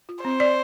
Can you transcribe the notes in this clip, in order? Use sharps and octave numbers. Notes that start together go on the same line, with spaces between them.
F4
C4 C5
D5